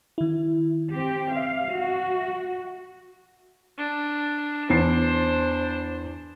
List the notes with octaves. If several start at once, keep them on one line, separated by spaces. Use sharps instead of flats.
D#3 E4
C4 G4
E5 F5
F#4
D4
E2 D4 C5 C7